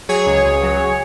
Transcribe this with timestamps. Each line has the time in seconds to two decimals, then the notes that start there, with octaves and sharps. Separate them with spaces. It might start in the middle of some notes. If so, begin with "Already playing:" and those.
0.09 F#3 G#4 C#5
0.26 C#2
0.45 C#2
0.63 F#3